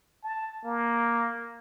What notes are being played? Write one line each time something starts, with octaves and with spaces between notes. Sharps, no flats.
A5
A#3